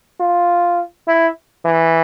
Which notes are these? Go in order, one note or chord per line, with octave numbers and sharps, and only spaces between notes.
F4
E4
E3